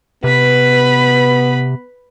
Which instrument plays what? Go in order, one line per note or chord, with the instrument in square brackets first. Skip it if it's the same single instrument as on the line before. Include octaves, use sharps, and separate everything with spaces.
[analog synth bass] C3 [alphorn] B3 [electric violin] B4 B5